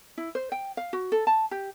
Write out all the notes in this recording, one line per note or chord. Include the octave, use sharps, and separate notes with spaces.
E4
C5
G5
F5
F#4
A4
A5
G4